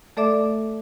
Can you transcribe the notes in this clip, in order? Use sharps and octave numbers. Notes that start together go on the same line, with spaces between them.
A3 A4 D5 E5 D6